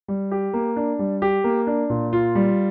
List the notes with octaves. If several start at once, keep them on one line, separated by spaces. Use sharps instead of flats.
G3
G4
A#3
D4
G3
G4
A#3
D4
A#2
F4
G3